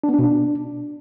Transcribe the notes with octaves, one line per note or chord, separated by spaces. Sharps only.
D4
B3
D4
B2
D4